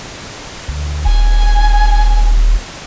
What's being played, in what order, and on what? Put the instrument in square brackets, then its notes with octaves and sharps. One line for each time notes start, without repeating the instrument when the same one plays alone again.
[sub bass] D2
[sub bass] D#1 [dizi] G#5